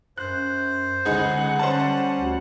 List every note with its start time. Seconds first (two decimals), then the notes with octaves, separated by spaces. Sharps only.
0.18 F#2 C5 F#6
1.05 C#2 D3 D#4 G#4 F#5
1.59 G3 C#4 C5 A5
2.18 D2